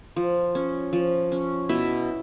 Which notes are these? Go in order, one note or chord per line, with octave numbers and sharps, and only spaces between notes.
F3
C#4
F3
C#4
B2 E4 E5